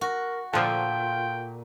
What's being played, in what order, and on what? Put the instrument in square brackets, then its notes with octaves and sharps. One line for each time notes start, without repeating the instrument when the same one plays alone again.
[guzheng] F#4 [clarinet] A#4
[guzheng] A#2 A4 [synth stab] D3 F3 [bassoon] F4 [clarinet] G5